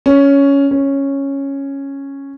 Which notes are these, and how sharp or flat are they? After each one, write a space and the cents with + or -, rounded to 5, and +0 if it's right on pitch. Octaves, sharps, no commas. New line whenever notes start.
C#4 +10
C#4 -5